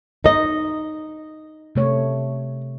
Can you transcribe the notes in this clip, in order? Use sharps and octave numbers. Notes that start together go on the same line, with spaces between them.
D#4 D#5
C3 A3 C#5